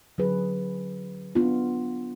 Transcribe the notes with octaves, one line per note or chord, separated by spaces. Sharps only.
D3 F#3 C#4 G#4 B4
B3 D4 F4